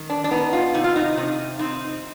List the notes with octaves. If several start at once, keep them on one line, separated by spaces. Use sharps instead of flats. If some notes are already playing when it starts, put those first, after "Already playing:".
Already playing: D#3
D4
D4
B3 D#4
F4
C3 D#4
F4
D#4
C3
C4 D#4